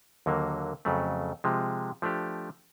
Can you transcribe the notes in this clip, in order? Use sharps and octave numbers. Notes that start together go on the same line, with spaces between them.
D#2 D3 F#3 A#3
F2 C#3 F#3 A3
C3 F3 G#3
F3 A3 D4 G4